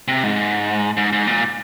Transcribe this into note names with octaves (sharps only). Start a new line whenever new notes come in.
C3
G#2
G#2
G#2
A#2